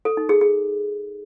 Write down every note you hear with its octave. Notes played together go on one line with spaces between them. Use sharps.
A4
D#4
G#4
G#4